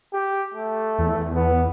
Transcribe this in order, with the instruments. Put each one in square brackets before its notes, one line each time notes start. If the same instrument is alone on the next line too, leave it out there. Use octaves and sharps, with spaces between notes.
[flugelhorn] G4
A3
[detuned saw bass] E2
[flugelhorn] B3